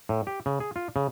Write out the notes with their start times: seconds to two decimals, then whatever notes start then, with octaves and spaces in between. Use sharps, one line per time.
0.09 A2
0.27 G4
0.46 C#3
0.60 G#4
0.76 F4
0.96 C#3